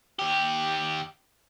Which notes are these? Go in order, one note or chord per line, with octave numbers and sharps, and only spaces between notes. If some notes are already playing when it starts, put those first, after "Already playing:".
D#2 G4